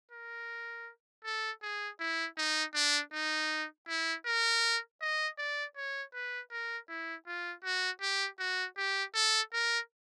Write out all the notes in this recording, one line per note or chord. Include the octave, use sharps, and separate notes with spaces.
A#4
A4
G#4
E4
D#4
D4
D#4
E4
A#4
D#5
D5
C#5
B4
A#4
E4
F4
F#4
G4
F#4
G4
A4
A#4